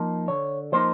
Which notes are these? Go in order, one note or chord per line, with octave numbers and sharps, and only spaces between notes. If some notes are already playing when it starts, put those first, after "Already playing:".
Already playing: F3 A#3 D#4
D3 C#5
F3 A#3 D#4 C5